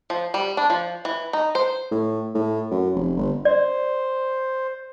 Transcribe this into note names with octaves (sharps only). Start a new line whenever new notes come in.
F3
G3
D4
F3
E3
D#4
C5
A2
A2
F#2
F1
G1
C5 D5